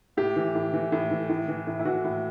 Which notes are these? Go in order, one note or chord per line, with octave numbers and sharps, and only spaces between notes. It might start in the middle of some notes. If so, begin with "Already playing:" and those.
A2 G4
E3
A2
E3
A2
E3
A2
E3
A2
E4
E3 F#4
A2